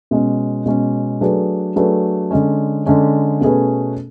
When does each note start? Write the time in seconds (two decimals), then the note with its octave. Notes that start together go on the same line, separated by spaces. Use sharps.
0.11 B2 G#3 C#4
0.66 B2 G#3 C#4
1.21 F#3 A3 D4 G#4 B4
1.76 F#3 A3 D4 G#4 B4
2.31 D3 G#3 C#4
2.86 D3 G#3 C#4
3.41 B2 A3 C#4 G#4 B4